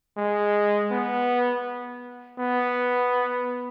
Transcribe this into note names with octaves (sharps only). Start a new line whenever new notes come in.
G#3
B3
B3